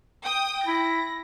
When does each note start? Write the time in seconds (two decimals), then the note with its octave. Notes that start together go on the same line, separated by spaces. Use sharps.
0.24 G5 D#6
0.66 E4 A#6